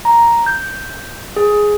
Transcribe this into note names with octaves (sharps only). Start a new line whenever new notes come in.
A#5
G6
G#4